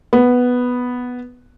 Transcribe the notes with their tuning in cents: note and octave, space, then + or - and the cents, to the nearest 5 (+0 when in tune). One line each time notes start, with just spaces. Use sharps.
B3 +0